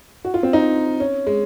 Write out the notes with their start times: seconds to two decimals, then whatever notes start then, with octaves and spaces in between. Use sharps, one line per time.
0.25 F#4
0.34 F4
0.43 C4
0.53 D#4
1.00 C#4
1.27 G#3